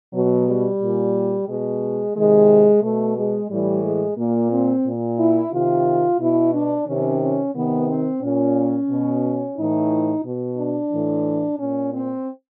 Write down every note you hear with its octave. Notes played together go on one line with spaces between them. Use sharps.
B2 F#3
G3
A#2
B2 G#3
C3 D#3 G#3
B2 A3
G#3
A2 E3 G3
G#3
A#2 A#3
C4
A#2
E4
C3 D#3 F4
B2 E4
D4
C3 D#3 C#4
C#4
C3 D#3 B3
C4
A#2 C#4
B2
A2 E3 D#4
B2
D4
A2 E3
A#2 C#4
C4